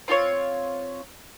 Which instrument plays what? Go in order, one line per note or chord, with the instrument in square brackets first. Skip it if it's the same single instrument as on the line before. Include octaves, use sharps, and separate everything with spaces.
[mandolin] C4 F4 A4 C#5